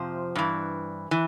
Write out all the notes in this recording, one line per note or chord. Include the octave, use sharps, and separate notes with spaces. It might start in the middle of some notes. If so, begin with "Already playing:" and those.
Already playing: F2 C3 F3 C5
G2 E3
E3